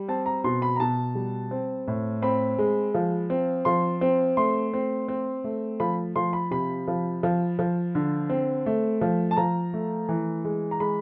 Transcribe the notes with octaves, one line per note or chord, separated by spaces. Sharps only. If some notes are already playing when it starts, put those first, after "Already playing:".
Already playing: G3
C4 A5
A#5
B2 C6
B5
A#5
B2 A5
G3
C4
A2
C4 B5
G#3
F3
C4
F3 C6
C4
A3 C6
C4
C4
A3
F3 B5
F3 C6
B5
C3 B5
F3
F3
F3
D3
C4
A3
F3
A5
F3 A#5
A3
E3
G#3
A#5
G#3 B5